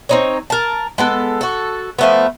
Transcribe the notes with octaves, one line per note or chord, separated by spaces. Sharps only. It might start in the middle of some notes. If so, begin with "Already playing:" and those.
C4 D#4 C#5
A#4 A5
G#3 B3 A4
F#4 A4
F3 A3 B3